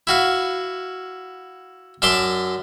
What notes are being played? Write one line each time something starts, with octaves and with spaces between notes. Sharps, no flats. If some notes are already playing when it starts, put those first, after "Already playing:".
E4 F#4 F5
F#2 D5 E5 A5 C6 D6